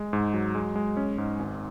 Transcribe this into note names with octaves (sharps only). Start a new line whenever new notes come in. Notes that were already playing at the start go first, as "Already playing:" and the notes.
Already playing: G#3
G#2
F#3
G#3
G#3
C#4
G#2
G#1